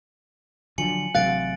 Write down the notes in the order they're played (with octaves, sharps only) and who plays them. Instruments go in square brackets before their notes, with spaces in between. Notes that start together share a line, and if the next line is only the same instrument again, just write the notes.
[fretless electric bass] D3 F3 F#3 [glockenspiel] G#5 C#7 F#7
[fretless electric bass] A1 C3 F#3 [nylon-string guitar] F5 [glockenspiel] F#6 A6 D7